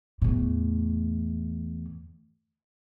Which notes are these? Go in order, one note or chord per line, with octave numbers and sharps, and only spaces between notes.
E2 A2